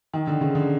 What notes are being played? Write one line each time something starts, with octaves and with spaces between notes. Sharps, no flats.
D#3
D3
C#3
D3